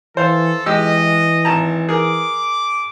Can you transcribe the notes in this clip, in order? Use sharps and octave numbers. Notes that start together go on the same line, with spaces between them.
E3 A4 C5 F5
E3 G#3 G4 D#5 E6
G#1 A5 A#5
G#4 A#4 D6